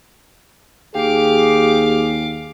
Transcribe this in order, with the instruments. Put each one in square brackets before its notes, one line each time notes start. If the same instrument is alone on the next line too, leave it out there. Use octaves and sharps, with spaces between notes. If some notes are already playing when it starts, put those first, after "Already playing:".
[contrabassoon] D#2 [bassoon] G4 [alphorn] G#4 [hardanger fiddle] F5 D6